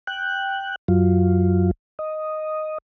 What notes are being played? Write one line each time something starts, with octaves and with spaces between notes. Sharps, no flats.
G5 F#6
F#2 F#3 F4
D#5